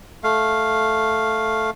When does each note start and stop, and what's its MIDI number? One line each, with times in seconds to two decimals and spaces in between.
0.24 1.70 57
0.24 1.70 77